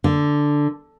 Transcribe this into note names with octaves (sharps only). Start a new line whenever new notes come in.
D3